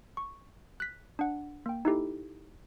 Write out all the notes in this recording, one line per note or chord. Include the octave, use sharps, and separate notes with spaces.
C#6
F#6 B6
D4 F#5
A#3 G5
D#4 E4 G4 A4